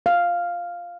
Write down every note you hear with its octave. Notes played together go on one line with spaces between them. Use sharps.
F5